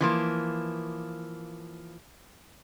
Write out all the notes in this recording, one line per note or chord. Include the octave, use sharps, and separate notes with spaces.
E3 F3 A#3